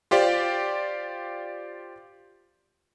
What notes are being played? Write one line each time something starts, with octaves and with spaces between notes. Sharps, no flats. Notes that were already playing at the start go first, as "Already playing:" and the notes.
F4 G4 C5 D5 F5